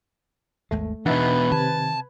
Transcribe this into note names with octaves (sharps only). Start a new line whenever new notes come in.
G#1 D#2 G#3 A3
E2 B2 D4 D#4 B4 E5 F#5
C3 D#3 A5 G#6